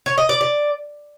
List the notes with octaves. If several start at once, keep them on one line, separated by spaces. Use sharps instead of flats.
C#5
D#5
D5
D5